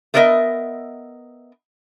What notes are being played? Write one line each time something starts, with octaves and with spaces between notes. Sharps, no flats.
A3 B3 A#4 C5 D#5 E5